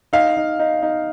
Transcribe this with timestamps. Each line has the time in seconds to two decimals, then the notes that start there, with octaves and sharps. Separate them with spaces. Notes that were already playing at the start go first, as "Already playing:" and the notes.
0.13 D#4 F5
0.37 D#4
0.59 D#4
0.82 D#4